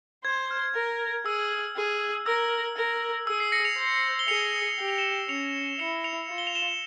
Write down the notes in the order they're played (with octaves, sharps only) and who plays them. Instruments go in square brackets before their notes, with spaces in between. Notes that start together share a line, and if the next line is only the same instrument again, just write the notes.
[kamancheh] C5 [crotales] G#6
[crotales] F6
[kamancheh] A#4
[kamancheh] G#4 [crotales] E6
[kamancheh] G#4
[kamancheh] A#4 [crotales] E6
[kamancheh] A#4
[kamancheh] G#4 [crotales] E6
[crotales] C7
A#6 C#7
C#7 F7
[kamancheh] C5
[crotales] G7
[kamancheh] G#4 [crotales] C#7 F7
[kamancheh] G4 [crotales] G7
[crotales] F7
E7 G7
[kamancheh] C#4 [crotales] C#7 F7
[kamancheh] E4 [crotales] C#7 F7
[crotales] C#7 F7
[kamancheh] F4
[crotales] G7
F7
E7 G7